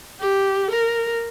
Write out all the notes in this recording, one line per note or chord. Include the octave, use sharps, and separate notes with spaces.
G4
A#4